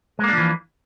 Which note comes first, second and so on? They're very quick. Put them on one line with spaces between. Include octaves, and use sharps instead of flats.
G#3 A#3 D4 F3 E3